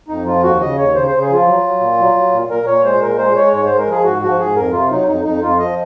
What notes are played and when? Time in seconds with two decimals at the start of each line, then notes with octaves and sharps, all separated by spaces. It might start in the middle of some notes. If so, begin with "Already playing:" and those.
0.08 F2 D#4
0.25 F3 F4
0.43 D#2 F#4
0.61 C#3 D#5
0.77 D#2 C#5
0.94 C#3 C5
1.07 C#3 C5
1.21 G#4
1.30 F3 F4
1.46 F#3
1.63 F#3
1.80 A#2
1.98 F#3
2.15 F#3
2.32 A#2
2.49 A#2 A#4
2.66 A#2 C#5
2.85 G#3 C5
3.01 A#2 A#4
3.18 G#3 C5
3.35 G#3 C#5
3.53 G#2 C#5
3.66 G#3 C5
3.78 A#4
3.87 F3 G#4
4.04 G#2 F#4
4.22 F3 F#4
4.39 G#2 G#4
4.55 F2 A#4
4.73 C3 F4
4.90 F#3 D#4
5.07 F2 D#4
5.24 F2 D#4
5.42 F2 F4
5.59 F3 D#5